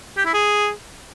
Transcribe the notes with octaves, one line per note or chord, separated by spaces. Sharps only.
G4
E4
G#4